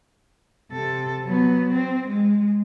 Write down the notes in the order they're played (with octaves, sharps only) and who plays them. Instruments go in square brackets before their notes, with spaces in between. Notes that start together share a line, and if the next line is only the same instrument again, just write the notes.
[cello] C3 A4
F#3 B3
C4
G#3